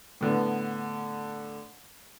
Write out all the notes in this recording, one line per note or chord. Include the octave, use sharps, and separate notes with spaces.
A2 D3 B3